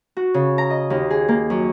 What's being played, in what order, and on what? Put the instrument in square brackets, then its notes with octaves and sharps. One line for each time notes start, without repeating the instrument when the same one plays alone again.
[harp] F#4
C#3
A#5
D#5
D#2
G#4
A#3
F#2